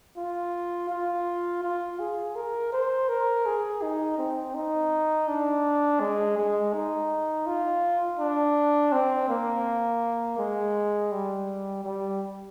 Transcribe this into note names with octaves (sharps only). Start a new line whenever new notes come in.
F4
F4
F4
G#4
A#4
C5
A#4
G#4
D#4
C4
D#4
D4
G#3
G#3
D#4
F4
D4
C4
A#3
G#3
G3
G3